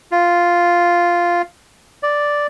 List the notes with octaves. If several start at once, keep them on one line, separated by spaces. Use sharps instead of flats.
F4
D5